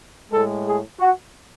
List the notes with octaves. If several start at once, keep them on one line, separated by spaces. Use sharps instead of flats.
A2 G#3 A4
G#4
F#4